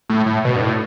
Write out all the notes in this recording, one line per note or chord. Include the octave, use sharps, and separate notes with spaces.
A2
A2
B2
G2
A2